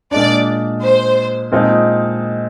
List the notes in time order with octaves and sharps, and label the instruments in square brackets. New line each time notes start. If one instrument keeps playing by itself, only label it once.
[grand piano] A#2 G#3 D4 [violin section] D5
[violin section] C5
[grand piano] A#2 F3 G#3 C4 D#4